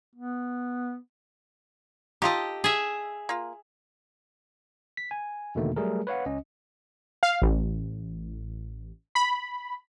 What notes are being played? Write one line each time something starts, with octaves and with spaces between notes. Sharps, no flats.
B3
D#4 F4 G4 A4 D#5
G#4 E5
A#3 F4
B6
G#5
E2 B2 D3 D#3 A3 A#3
F#3 G3 A3 G#4 A#4
B4 C#5 F5 F#5
C#2 C#4 D#5
F5
A1
B5